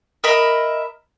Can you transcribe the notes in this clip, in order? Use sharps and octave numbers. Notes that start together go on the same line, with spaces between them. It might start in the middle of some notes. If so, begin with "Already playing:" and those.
A#4 D#5 E5 B5